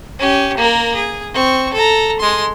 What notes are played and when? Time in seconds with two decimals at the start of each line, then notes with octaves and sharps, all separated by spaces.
0.19 C#4 G4
0.57 A#3 A#4
0.95 G#4
1.34 C4 C#6
1.73 A4 A#5
2.20 G#3 C6